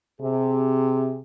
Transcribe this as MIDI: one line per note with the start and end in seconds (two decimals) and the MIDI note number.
0.21 1.20 48
0.21 1.20 68